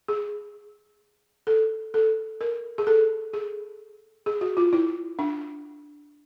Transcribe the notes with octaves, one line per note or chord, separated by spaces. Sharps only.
G#4
A4
A4
A#4
G#4
A4
G#4
G#4
F#4
F4
E4
D4